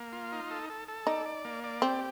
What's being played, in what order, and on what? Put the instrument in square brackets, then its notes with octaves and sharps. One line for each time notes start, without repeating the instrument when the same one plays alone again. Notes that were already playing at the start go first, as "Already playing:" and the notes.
Already playing: [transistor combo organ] A#3
F4
D#4
A4
A4
A4
[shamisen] D#4 [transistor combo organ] D5
[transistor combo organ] D5
A#3
D5
[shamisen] C4 [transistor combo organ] G4